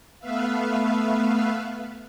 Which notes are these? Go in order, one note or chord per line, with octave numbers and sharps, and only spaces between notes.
A3 B3 B4 E5 F5